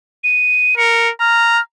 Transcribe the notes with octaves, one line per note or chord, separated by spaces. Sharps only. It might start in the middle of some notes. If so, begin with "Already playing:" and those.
D#7
A#4 C#7
A#5 F6